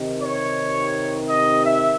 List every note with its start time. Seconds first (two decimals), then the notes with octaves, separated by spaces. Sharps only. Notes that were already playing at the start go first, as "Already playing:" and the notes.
Already playing: C3 D#3
0.23 C#5
1.29 D#5
1.65 E5